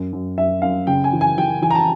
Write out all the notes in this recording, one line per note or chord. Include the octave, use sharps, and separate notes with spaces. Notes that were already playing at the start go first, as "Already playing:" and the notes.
Already playing: F#2
F#2
F#2 E5
F#2 F5
C#3 G5
G#5
E3
G#5
E3 G5
E3 G#5
A#5
A5